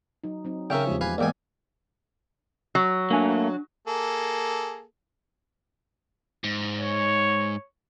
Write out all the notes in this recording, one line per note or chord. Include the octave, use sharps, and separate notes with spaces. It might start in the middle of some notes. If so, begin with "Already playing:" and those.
F#3 D#4
F#3 C4 D#4
C#3 C#4 A#4 E5 G5
E2 F3 G#3 A3 G4
B4 F5 G#5
E2 G#2 A#3 D5 G5 G#5
F#3
A3 A#3 D4 G#5
A#3 G#4 A4
G#2
C#5